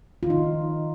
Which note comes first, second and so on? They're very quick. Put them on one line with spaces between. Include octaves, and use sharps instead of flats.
F4 D#3 D#4